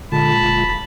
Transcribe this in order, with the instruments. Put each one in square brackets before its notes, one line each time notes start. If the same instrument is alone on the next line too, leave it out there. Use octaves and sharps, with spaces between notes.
[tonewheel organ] A#2 G#3 F4 [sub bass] D3 [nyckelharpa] A5 [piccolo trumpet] B5
[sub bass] E1